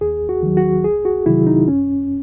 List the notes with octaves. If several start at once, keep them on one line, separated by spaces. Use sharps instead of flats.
D#2 G#4
F#4
D#3 F#3
F#4
C2 G#4
F#4
C3 D#3 F#3 E4
D#4
F#2 C#4